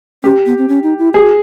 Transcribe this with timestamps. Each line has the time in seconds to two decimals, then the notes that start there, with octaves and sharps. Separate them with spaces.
0.23 C#4 G4
0.46 B3
0.58 C4
0.69 C#4
0.83 D#4
0.99 E4
1.14 G4 G#4
1.22 F#4